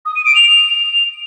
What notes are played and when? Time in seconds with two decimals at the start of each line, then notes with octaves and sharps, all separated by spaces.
0.06 D#6
0.16 D#7
0.26 D7
0.35 F7